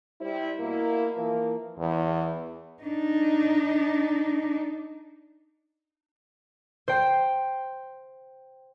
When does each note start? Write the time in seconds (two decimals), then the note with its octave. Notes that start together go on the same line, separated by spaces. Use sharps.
0.21 G3 E4 C5
0.59 B2 A#3 E4
1.14 E3 F3 A#3
1.79 E2
2.83 D4 D#4
6.88 C5 G5